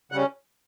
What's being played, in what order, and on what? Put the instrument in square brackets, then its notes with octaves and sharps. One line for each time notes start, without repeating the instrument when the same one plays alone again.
[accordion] C#3 G3 C#4 F#5